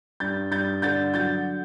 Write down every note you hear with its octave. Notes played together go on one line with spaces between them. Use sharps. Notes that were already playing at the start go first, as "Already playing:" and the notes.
G2 G6 A6
G2 G6 A6
D3 G6 A6
F#3 G6 A6